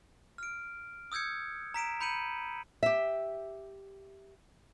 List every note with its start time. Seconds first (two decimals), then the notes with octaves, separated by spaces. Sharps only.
0.38 F6 D7
1.12 D#6 E6 G6 G#6 C#7
1.74 A#5 B6 D7 E7
2.01 B5 G6 C#7 D#7 F#7
2.83 G4 E5